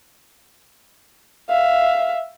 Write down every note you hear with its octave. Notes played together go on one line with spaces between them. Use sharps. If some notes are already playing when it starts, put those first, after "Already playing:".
E5 F5